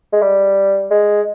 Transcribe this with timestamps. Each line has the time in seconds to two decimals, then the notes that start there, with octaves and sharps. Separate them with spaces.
0.13 G#3
0.22 G3
0.91 G#3